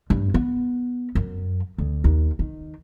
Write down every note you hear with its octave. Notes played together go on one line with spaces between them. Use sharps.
G2
B3
F#2
D2
D#2
D#3